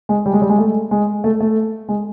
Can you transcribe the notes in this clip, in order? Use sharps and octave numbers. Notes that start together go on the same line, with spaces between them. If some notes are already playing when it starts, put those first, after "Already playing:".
G#3
G3
G#3
G3
G#3
A3
G#3
A3
A3
G#3